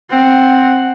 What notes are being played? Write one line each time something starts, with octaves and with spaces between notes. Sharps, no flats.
C4 F#5